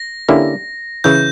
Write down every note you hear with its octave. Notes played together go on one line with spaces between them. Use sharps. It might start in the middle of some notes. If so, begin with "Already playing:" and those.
Already playing: A#6
D3 A#3 C#4 E4 G4
C#3 E3 G6